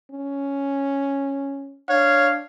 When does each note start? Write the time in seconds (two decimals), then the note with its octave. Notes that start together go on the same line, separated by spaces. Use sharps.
0.11 C#4
1.89 D4 C#5 F5